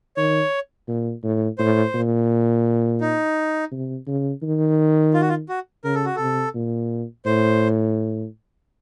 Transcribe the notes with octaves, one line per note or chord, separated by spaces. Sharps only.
D#3 C#5
A#2
A2
A2 C5
A#2
D#4
C3
C#3
D#3
F4
F#4
F4
F#4
C#3 A#4
A4
F#4
C3 A4
A#2
A2 C5